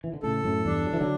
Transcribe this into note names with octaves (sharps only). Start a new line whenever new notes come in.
E3
D3
A2 C#3 A4
F#2 A2
E2 G2 D4
F#3
E3
D3 F#3